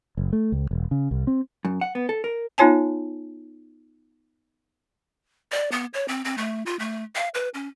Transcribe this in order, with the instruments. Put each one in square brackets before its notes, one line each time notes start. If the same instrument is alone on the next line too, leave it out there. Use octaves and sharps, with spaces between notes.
[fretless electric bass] F#1
A3
C#2
E1
C#3
C2
C4
[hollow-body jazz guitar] F#2
F#5
B3
A4
A#4
[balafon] B3 D#4 F4 C#5 G#5 A5
[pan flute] D5
B3
C#5
C4
C4
A3
F4
A3
F5
B4
C#4